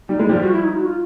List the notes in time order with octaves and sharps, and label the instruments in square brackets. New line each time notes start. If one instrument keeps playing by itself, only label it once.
[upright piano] G3 [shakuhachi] D#4
[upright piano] G#3 [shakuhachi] E4
[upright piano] F3 G3 [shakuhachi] F4
[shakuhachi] F#4
E4
D#4
F#4
F4